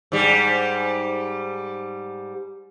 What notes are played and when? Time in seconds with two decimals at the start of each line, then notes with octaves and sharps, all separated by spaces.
0.12 G#2 G3